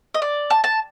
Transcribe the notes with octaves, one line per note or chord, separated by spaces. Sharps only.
D#5
D5
A5
A5